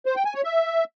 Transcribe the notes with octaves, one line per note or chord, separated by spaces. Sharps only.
C5
G5
G#5
C#5
E5